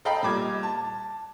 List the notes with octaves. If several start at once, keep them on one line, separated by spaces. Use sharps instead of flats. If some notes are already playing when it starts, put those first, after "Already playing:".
A4 D#5 F5 G5 A#5 B5
A#2 G3 D6 G#6
A5